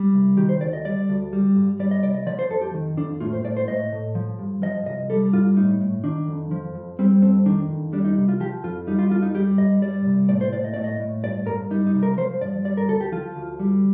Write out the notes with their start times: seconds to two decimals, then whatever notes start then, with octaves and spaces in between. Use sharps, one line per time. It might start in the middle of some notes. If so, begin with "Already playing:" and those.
Already playing: G3
0.14 C2
0.37 D#3 G4
0.49 C5
0.61 D2 D5
0.73 D#5
0.85 G3 D5
1.09 D2
1.33 G3
1.56 G2
1.79 G3 D5
1.91 D#5
2.03 C2 D5
2.14 D#5
2.27 F3 D5
2.39 C5
2.50 F2 A4
2.61 G4
2.74 D#3
2.97 F2 D4
3.20 A2 F4
3.33 C5
3.44 A2 D5
3.57 C5
3.68 A2 D#5
3.92 A2
4.15 F3
4.39 G2
4.63 F3 D#5
4.86 C2 D#5
5.10 G3 A4
5.33 G2 F4
5.57 A2 D#4
5.81 A2
6.04 D#3 D4
6.28 F2
6.51 F3
6.75 F2
6.99 G3 C4
7.22 F2 C4
7.46 D#3 D4
7.70 F2
7.93 G3 D4
8.05 D#4
8.17 C2
8.29 F4
8.40 F3 G4
8.64 F2 F4
8.87 G3 D#4
8.99 F4
9.11 F2 F4
9.22 D#4
9.35 G3 G4
9.58 G2 D#5
9.82 G3 D5
10.05 C2
10.29 A2 D5
10.41 C5
10.52 A2 D5
10.64 D#5
10.74 A2 D5
10.84 D#5
11.00 A2
11.23 G2 D5
11.47 G2 A#4
11.71 G3 D#4
11.87 D#4
11.94 C2
12.03 A#4
12.18 F3 C5
12.41 G2 D5
12.65 G3 D5
12.77 A#4
12.89 D2 A4
13.01 G4
13.12 F3 F4
13.36 D2
13.60 G3